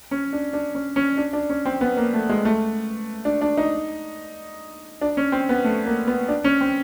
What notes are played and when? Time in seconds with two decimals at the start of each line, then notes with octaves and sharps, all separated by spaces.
0.11 C#4
0.33 D4
0.53 D4
0.75 C#4
0.96 C#4
1.17 D4
1.33 D4
1.49 C#4
1.65 C4
1.81 B3
1.97 A#3
2.13 A3
2.29 G#3
2.45 A3
3.25 D4
3.41 D4
3.57 D#4
5.01 D4
5.17 C#4
5.32 C4
5.49 B3
5.65 A3
5.86 A#3
6.07 B3
6.29 D4
6.44 C#4
6.61 C4